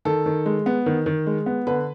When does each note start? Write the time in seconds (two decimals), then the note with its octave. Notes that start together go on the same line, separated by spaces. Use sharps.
0.05 D#3 A4
0.26 D#3
0.46 G#3
0.66 B3
0.86 D#3
1.06 D#3
1.27 G#3
1.46 B3
1.67 D3 B4